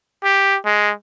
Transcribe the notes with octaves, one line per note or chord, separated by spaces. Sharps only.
G4
G#3